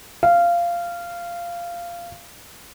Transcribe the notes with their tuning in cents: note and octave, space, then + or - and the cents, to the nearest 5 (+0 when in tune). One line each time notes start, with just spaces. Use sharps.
F5 -15